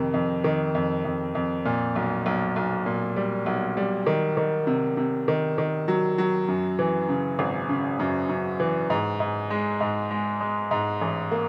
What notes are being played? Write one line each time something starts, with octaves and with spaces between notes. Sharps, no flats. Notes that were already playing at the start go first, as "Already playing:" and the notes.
Already playing: F2 C3 D#3
F2
D#3
F2
F2
F2
A#2
B1
B1
B1
A#2
G3
B1
G3
D#3
D#3
C3
C3
D#3
D#3
F#3
F#3
F#2
E3
C#3
G#1
C#3
F#2
F#2
E3
G#2
G#2
G#3
G#2
G#3
G#3
G#2
A1
A#3